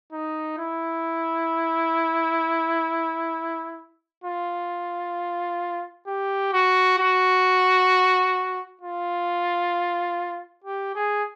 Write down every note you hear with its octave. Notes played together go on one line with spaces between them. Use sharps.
D#4
E4
F4
G4
F#4
F#4
F4
G4
G#4